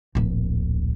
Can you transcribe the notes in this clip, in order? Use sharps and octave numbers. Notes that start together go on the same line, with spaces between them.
D1 A#1